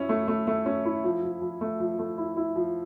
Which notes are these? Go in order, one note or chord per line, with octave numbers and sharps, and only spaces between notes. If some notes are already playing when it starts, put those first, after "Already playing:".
Already playing: C#4 E4
A3
A3
A3
C#4
E4
F3
F3
F3
A3
F3
A3
E4
E4
F3